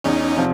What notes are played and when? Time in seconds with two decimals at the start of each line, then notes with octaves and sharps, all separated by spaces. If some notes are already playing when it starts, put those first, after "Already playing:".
0.04 E2 C#4 D#4
0.37 C3 F3